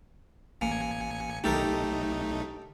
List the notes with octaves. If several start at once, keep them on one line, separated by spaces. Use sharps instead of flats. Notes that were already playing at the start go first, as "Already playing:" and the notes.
A1 A#3 G#5 C#7
B1 A3 D#4 G4 A4 A#4